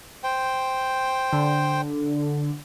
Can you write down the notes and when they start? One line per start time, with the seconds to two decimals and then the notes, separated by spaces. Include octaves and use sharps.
0.24 C5 G5
1.33 D3